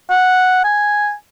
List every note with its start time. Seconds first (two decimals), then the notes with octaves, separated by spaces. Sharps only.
0.10 F#5
0.64 G#5